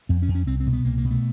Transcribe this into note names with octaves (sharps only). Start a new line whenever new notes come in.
F2 C4
C#4
F2
C#4
C2 C4
C4
B2
B3
C2 A#3
A#3
B2
A3